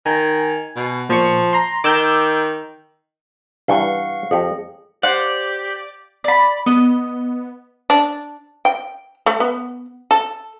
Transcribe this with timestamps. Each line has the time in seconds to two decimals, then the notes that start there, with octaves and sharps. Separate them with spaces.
0.06 D#3 G#5
0.76 B2
1.09 A#2 F3 C#6
1.53 A#5 C6
1.84 D#3 D6 E6 G6
3.68 G2 E3 F5 F#5 C#6
4.31 F2 G4 G#4
5.03 G4 C5 D5 F5 F#5
6.24 D5 B5
6.66 B3 D#5
7.90 D4
8.65 G5
9.26 A3
9.40 B3
10.11 A4